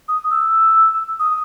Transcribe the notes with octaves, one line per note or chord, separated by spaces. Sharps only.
D#6
E6
D#6